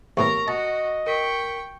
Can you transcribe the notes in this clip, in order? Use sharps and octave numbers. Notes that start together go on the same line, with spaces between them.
D#2 A2 B3 A#4 A#5 C#6
F#4 D#5 A5
A#4 G5 C#6 B6